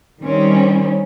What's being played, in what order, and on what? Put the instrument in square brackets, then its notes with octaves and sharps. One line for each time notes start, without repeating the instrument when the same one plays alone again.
[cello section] D#3 G3 C4 C#4